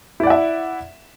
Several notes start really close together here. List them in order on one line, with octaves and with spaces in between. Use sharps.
E4 D5 F#5 E5